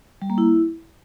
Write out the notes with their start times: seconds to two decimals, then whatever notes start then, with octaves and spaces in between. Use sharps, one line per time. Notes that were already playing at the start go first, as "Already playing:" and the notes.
0.22 G3
0.30 A#3
0.38 E4